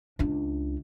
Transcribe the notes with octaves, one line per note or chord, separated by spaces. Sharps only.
C#2 D4